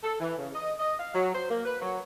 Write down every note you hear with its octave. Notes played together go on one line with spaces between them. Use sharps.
A4
E3
C#3
D#5
D#5
F5
F#3
C5
A#3
B4
F#3